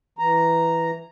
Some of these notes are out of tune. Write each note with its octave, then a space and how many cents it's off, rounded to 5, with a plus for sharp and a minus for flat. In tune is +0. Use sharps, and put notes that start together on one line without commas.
E3 +0 A#5 +0